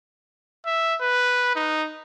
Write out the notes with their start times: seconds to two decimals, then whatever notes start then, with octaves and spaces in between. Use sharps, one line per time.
0.66 E5
1.01 B4
1.56 D#4